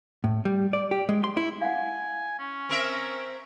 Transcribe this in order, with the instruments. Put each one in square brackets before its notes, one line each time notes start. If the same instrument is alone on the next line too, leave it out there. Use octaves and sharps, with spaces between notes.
[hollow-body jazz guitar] A2
G3
D5
G4
G#3
C6
E4
[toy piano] F5 F#5 [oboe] G#5
[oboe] C#4
[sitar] C4 A#4 E5